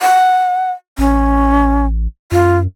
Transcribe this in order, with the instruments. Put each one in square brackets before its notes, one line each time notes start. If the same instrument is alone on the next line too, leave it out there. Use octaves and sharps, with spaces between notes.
[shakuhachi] F#5
[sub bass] A1 [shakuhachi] C#4
[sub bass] F#2 [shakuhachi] F4